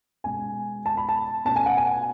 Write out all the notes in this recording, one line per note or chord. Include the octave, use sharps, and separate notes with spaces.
B2 G#3 C#4 G#5
A5
B5
A5
B2 A3 C#4 A5
G#5
F#5
G#5